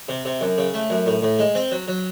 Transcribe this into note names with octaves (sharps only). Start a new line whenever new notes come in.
C3
C3
F#2
C#3
A3
F#2
A2
A2
G#3
C4
F#3
F#3